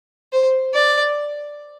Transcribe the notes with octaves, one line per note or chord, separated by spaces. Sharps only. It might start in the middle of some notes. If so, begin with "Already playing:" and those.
C5
D5